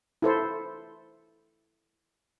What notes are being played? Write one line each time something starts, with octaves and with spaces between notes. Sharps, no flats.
E4 A4 C5